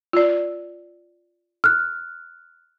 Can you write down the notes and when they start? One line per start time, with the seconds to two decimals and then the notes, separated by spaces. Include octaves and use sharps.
0.13 F4 D5
1.64 F6 F#6